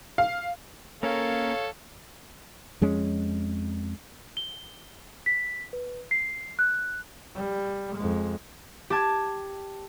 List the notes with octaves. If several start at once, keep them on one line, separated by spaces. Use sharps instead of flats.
F5
A#3 C#4 A4 A#4 C#5 F5
F2 G#3 C#4
G7
B6
B4
C7
F#6
G3
F2 G#3
G4 A5 G#6